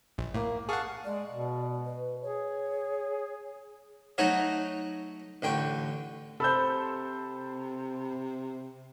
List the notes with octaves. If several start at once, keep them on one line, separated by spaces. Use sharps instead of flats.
A#1
A2 A#3
G#4 F5 F#5 A5 C#6
G#3 D5
B2
B4
G#4 C#5
F#3 A3 D#4 F#4 C#5 D#5
A1 D3 G5 C#6
C3 A4 C5 B5 E6 G6